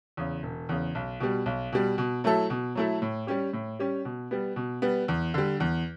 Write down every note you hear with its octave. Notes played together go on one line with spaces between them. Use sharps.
E2 C#3
E1
E2 C#3
B1
B2 G3
B1
B2 G3
B2
F#3 A3 E4 A4
B2
F#3 A3 E4 A4
A2
G3 C#4 G4
A2
G3 C#4 G4
B2
G3 B3
B2
G3 B3
E2
D3 G3
E2